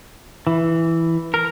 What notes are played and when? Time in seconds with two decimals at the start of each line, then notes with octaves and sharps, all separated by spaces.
0.47 E3
1.34 A#4